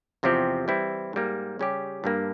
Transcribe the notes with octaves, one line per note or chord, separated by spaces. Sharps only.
E2 C3 F3 C4 G4
E3 G3 C4 E4
G#2 G3 A#3
C#3 G3 C#4 G4
G2 G3 A#3